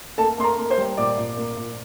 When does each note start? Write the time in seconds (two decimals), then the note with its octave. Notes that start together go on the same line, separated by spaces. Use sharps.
0.18 A#3 A4 A5
0.38 A#3 C6
0.44 A#4 A#5
0.57 A#3
0.70 C5 C6
0.78 G3
0.97 A#2 D5 D6
1.17 A#2
1.37 A#3
1.56 A#2